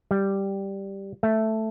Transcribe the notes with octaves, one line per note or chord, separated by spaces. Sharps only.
G3
A3